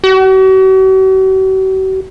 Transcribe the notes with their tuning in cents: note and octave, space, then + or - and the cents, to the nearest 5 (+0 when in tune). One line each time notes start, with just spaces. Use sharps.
F#4 +45